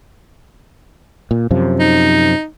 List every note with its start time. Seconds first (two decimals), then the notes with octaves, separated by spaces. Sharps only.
1.31 A#2
1.51 F#2 C3 F3
1.80 D#4